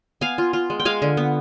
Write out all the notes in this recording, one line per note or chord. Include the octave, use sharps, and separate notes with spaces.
B3 F5 G#5
F4
F4
G#3
G5
G#3 F5 G#5
D3
B3